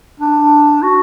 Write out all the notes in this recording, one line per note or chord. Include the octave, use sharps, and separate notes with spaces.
D4
F#4